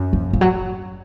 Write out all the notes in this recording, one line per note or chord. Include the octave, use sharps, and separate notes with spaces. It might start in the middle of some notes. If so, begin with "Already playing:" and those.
Already playing: F#2
F3
F3
F#3